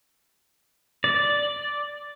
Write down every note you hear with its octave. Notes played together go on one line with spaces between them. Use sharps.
D5